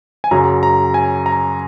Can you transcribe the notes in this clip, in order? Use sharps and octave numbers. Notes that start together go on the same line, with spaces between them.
G#5
F#2 C#3 F#3 A#5
A#5
G#5
A#5